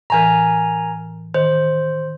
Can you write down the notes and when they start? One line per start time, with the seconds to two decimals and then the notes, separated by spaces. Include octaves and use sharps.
0.10 A2 E3 A#4 G#5 A#5
1.34 D#3 C5